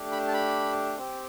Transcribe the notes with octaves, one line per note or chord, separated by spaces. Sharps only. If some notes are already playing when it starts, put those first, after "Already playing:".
Already playing: A3 D4 G4
B5
A5
B5
C4 G4